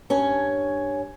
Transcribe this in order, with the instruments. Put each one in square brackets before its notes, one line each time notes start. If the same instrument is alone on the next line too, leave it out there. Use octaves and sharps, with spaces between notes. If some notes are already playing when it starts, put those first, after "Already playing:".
[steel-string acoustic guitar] G2 C#4 C#5 G#5